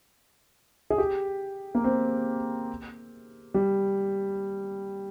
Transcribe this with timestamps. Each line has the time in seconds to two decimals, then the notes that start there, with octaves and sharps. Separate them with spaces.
0.90 G#4
0.98 G4
1.75 A#3
1.84 C4
3.54 G3